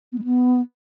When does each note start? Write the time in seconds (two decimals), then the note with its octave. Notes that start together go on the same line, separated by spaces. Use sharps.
0.13 B3
0.18 G#3
0.24 B3